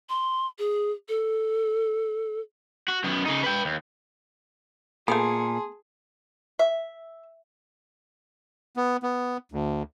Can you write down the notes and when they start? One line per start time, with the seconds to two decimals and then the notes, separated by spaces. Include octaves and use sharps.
0.09 C6
0.59 G#4
1.09 A4
2.89 F#4
3.04 F#2 B3
3.26 C#3 D#4
3.44 B4 G5
3.65 D#2
5.08 A#2 A3 B3 G#4 G#5 A5 C6
6.59 E5
8.77 B3
9.03 B3
9.52 D2